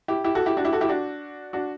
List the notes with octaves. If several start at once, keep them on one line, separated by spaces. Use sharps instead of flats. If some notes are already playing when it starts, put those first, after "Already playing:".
E4 G4
E4 G4
F#4 A4
E4 G4
D4 F#4
E4 G4
F#4 A4
E4 G4
D4 F#4
D4 F#4